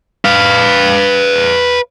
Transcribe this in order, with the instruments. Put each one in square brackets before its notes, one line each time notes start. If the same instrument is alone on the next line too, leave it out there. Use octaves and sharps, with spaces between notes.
[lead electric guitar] B4 F5